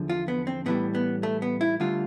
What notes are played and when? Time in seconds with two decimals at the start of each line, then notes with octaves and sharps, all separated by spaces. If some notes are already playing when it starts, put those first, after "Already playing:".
Already playing: E2 D3 F3
0.10 F4
0.28 B3
0.47 C4
0.66 A2 E3 G3 B3
0.95 B3
1.23 A3
1.42 B3
1.61 E4
1.80 D2 D3 G3 F4